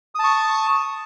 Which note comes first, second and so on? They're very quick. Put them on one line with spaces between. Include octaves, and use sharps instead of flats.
D#6 A5 C#6